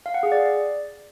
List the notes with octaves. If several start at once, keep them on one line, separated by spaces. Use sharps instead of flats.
F5
F#5
G#4
D5